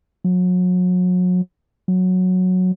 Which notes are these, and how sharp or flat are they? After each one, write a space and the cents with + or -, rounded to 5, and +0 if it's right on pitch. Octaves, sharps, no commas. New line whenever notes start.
F#3 -35
F#3 -10